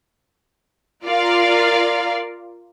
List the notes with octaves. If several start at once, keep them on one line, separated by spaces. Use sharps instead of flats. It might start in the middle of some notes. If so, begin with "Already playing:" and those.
F4 A#4 D5 F5